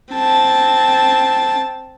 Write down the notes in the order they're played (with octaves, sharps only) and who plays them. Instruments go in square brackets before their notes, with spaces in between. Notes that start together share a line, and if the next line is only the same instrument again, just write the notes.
[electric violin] C4 A5